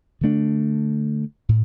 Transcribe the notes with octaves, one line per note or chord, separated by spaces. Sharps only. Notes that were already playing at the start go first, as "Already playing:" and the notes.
D3 A3 D4
A2